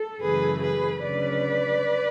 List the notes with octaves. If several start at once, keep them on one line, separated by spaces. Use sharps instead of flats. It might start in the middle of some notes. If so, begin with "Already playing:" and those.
Already playing: A4
F#2 C#3 E3 A3 G#4 B4
G#4 B4
D2 C#3 F#3 C#4 B4 D5